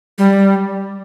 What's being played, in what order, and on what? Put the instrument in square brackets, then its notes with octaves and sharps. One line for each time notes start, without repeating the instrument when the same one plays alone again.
[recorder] G3